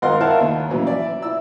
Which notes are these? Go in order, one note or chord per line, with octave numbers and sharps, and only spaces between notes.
G#1 A#4 D#5 F5 F#5 C6
E4 A#4 C#5 F5 F#5 A5
D#2
F2 A#2 E3 F#3 C#4
D5 E5
E4 E6